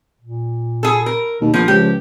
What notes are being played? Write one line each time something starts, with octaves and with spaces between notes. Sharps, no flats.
A#2
G#4 A4
A#4
D#2 B2
A#1 F3 B3 A#4
C#2 F3 G4